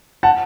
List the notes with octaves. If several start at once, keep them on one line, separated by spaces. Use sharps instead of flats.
F#5 A5